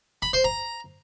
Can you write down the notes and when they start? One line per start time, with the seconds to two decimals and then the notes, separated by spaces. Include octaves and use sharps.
0.22 B5
0.33 C5
0.44 A#5